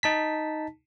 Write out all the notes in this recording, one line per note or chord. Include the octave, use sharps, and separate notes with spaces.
D#4 A5 B6